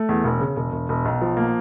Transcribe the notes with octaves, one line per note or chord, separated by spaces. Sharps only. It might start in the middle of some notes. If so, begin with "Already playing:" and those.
Already playing: A3
E2
E1
C#3
E1
E1
E1
B1
F3
A#3